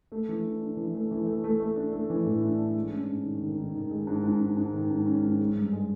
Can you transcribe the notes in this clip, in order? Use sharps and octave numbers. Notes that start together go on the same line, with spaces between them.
A3
E3
D4
D4
E3
A3
E3
A3
A3
A3
D4
A3
E3
A2
D4
D4
G#3
C#4
G#2
D#3
D#3
D#3
D#3
G#3
G#2
G#2
G#2
G#2
D#3
G#2
C#4
G#2
G#3
G2
G#3